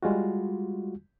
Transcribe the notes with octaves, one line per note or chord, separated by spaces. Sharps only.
G3 G#3 F4 F#4